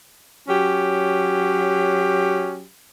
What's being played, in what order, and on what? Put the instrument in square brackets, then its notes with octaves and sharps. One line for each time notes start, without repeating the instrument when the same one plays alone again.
[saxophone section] F#3 C#4 G4